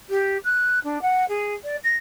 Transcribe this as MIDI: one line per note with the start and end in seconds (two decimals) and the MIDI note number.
0.10 0.38 67
0.44 0.79 90
0.84 1.01 62
1.02 1.25 78
1.29 1.54 68
1.64 1.77 74
1.84 1.96 94